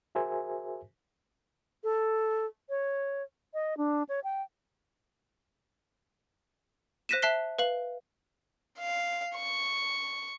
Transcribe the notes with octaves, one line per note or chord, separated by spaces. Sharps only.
F#4 G#4 A#4 C5 E5 G#5
A4
C#5
D#5
D4
C#5
G5
C5 F#6 A#6 B6 D#7 E7
E5 A5 F#6 B6 C7 G7
B4 F5 F#7
F5
C#6